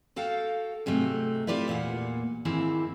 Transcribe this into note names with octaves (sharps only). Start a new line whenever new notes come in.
F#4 A4 F5 G5
G#2 C3 F#3 A3
E4 F4 G4 B4 D5 E5
E2 A#2 A#3 F#5
D#2 G#2 E3 C4 E4